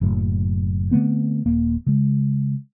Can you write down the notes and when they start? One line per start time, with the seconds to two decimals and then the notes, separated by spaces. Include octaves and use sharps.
0.01 F#1 F#2 A2 C#3
0.91 D3 A3 B3 C4
1.46 D#1 A#3
1.87 C#3 G#3